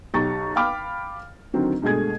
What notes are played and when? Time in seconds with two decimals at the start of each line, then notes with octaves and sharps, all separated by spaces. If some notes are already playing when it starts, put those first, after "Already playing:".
0.14 B1 G4 A#5 C#6 A6
0.56 F5 G5 B5 D6 F6
1.53 D3 D#3 F#3 C4
1.82 G2 B2 G#3 A3 G#4 G#6